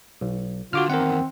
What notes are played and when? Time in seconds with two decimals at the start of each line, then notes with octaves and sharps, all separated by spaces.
0.21 B1
0.73 D3 F4 F#4 D6 F6
0.90 E2 D#3 C4 A#4 F#5